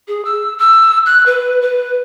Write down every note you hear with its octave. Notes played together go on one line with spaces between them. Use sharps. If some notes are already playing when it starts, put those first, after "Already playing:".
G#4
E6
E6
F#6
B4
B4